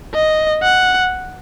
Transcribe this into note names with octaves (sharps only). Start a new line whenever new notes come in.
D#5
F#5